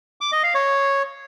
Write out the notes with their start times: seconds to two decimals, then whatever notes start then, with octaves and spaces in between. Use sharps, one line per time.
0.21 D6
0.32 D#5
0.43 F5
0.55 C#5